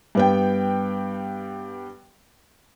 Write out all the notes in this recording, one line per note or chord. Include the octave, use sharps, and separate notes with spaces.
G2 B3 G5